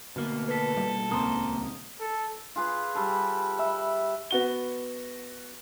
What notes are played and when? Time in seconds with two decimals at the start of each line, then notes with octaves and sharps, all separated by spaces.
0.16 D2 B2 A#3
0.48 A4 B4 B6
0.76 B2 G3 A#3
1.11 D#1 C#2 A#3 C4 C5 A#5 D#6
2.00 A4
2.56 F4 G#4 B4
2.95 G3 A4
3.59 E5 B5
4.31 B3 F#4 G7